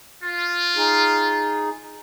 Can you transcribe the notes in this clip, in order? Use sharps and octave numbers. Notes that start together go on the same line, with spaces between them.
F4
D#4 G#4